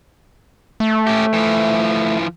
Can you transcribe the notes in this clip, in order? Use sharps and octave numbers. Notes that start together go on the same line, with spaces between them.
A3
C#4 G4
E3 F3